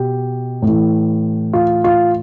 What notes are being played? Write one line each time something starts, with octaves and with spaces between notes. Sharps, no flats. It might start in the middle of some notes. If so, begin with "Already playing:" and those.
Already playing: B2 G4
A2 E3
F4
F4